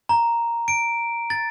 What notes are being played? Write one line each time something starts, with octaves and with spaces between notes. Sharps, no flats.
A#5
D7
A6